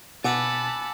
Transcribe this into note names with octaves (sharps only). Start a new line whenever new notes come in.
B2 F#5 G#5 A5 B5 D6 E6